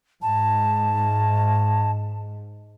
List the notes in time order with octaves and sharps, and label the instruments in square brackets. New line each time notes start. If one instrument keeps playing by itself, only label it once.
[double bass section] G#2 [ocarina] A5